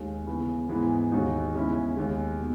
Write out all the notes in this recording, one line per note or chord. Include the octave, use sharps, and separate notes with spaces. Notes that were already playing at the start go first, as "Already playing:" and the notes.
Already playing: D#2 D#3 G#3
C#3 E3 B3
G#2 E3 G#3 B3
D#2 D#3 G#3 D#4 F#4
E2 C#3 G#3 C#4 E4
D#2 D#3 G#3
B2